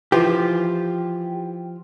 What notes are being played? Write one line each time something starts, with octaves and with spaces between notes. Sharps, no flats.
E3 F3 G4